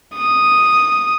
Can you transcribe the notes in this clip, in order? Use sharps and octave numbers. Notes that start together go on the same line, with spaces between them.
D#6